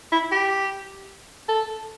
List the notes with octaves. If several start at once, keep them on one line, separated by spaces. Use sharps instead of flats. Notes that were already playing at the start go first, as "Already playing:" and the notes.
E4
G4
A4